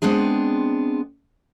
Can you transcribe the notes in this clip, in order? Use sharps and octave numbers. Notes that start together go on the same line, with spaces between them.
G#3 B3 C4 D4 G#4